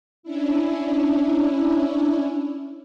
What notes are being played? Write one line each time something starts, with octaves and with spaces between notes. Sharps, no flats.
C#4 D4 E4